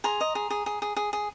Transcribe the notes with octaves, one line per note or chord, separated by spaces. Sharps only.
G#4 A#5 C6
D#5
G#4
G#4
G#4
G#4
G#4
G#4